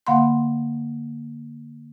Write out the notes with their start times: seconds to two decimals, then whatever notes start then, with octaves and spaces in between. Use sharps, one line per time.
0.07 D3 A#3 F5 F#5 B5 C6